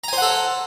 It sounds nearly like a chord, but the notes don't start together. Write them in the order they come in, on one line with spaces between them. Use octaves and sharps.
A#5 G#5 C5 F#5 A4